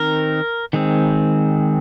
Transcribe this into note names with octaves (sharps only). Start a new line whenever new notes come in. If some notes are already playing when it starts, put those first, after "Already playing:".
Already playing: D#3 C4 D#4 A#4
D#3 G#3 C4